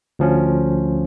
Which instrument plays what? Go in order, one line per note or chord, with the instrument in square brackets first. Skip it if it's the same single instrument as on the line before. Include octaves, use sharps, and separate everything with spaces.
[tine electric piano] D2 F3 C#4